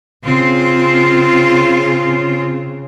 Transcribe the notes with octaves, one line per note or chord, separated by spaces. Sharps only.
C#3 C4 F4